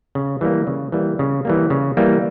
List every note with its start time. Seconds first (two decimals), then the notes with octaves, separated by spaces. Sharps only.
0.15 C#3
0.41 E3 G3 A#3
0.67 C#3
0.92 E3 G3 A#3
1.19 C#3
1.45 E3 G3 A#3
1.70 C#3
1.97 E3 G3 A#3